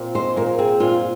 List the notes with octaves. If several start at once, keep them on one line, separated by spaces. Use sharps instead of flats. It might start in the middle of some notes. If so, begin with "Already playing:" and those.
Already playing: A#2 C4
G#3 C5
A#2 A#4
C4 G#4
A#2 F4